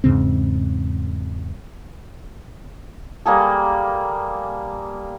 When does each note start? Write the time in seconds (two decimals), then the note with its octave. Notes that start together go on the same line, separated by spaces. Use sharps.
0.04 E2 G#2 C#3 C4
3.26 G3 A#3 G#4 A4